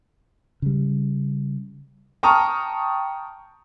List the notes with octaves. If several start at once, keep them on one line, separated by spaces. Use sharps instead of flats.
C#3 G3
G5 A5 A#5 C#6 D#6 F6